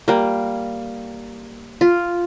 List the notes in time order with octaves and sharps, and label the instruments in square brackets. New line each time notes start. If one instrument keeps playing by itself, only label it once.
[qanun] G3 A#3
F4